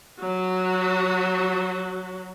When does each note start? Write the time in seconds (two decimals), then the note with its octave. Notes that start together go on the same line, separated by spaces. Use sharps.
0.20 F#3 F#4